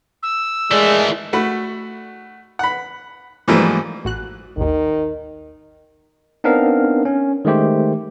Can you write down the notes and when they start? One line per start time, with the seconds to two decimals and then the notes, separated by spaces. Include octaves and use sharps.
0.22 E6
0.71 E3 G#3 A3 G#4 A#4 D5
1.33 A3 F#4 B5
2.59 F#5 B5
3.48 G#2 E3 F3 G3 A3 A#3
4.05 A1 F#4 F#6
4.57 A1 D#2 D#3
6.44 B3 C4 D4 D#4 A#4 F5
7.05 C#4
7.45 D#3 G#3 A3 G4 C5